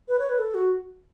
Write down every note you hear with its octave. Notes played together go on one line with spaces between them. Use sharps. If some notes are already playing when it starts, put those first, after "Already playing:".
B4
C#5
B4
A4
F#4